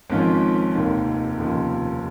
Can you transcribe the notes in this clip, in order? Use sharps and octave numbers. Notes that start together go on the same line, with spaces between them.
G#1 G#2 F3 C#4 F4
F1 D#2 D#3
F1 D#2 C#3 F3